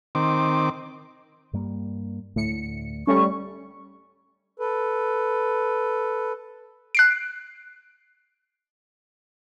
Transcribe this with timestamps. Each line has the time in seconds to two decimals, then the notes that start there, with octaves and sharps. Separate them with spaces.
0.15 D#3 C4 D6
1.53 G2 G3 A#3
2.36 D2 A2 A3 C#7
3.07 G3 A3 C#4 C#6
4.60 A4 B4
6.95 F#6 C7 D7